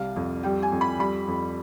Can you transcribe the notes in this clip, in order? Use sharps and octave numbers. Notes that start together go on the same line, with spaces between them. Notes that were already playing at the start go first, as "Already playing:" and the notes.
Already playing: C2 G3 F5
F2
G3 G5
G#5
F2
B5
G3 B5
F2